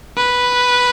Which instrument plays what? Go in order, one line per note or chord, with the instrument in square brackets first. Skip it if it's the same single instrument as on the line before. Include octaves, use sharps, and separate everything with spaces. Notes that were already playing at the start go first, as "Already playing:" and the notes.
[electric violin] B4